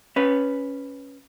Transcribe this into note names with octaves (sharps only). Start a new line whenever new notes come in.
C#4 B4